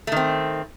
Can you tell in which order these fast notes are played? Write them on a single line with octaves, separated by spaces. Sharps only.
A3 D#3 C4